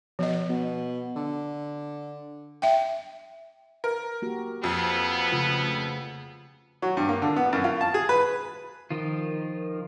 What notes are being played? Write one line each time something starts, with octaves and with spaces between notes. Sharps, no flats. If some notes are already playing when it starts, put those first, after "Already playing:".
B2 F3 D#5
B2
D3
E5 G5
A#4
A#3 F#4 G4
F2 B3
C#3 A3 F4
A3
F#3
G2
A#3
D3
B3
F#2
F4
A5
G#4
B4
D#3 F3 F4